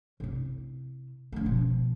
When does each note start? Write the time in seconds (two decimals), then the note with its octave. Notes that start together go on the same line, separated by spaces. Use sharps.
0.20 C3 E4
1.32 C#3 A3
1.46 B2 F3